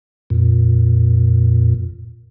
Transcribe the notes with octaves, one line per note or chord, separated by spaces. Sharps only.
F2 A#2